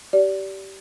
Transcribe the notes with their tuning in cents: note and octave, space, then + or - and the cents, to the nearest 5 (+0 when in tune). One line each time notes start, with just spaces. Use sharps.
G4 -20 D5 -25